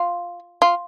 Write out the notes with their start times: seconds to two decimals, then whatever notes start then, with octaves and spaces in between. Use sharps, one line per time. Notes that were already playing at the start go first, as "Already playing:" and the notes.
Already playing: F4
0.62 F4